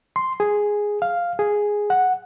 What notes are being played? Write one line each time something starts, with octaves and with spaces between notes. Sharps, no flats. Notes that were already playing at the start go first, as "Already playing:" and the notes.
C6
G#4
F5
G#4
F#5